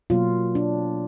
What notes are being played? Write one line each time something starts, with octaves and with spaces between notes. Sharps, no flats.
B2 F#3 A#3 F4
D4